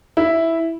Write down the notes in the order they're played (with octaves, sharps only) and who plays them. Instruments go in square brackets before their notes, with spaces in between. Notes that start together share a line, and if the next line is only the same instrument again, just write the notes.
[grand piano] E4